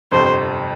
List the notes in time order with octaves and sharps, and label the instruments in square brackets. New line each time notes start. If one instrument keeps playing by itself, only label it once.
[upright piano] G1 F2 C3 [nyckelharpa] C5